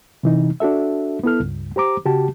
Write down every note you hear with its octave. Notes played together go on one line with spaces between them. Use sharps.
C3 E3 D#4
D4 F#4 A4 E5
B3 E4 A4 F6
C#2 G2
G4 C5 A#5 D6
C#3 F#4 G4 A5